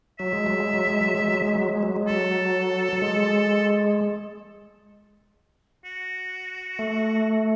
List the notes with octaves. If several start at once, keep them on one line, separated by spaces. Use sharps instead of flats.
F#3 E5
G#3
F#3
G#3
F#3
G#3
F#3
G#3
F#3
G#3
F#3
G#3
F#3
G#3
F#3 A4
F#3
G#3
F#4
A3